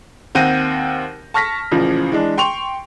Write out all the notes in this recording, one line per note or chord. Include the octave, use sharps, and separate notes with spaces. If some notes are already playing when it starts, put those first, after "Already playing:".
D#2 C4 F#5 G6 A#6 D#7
A5 C#6 F6 A#6 B6
A1 A#2 C#3 F3
E3 G#3 D4
G5 C6 C#6 F7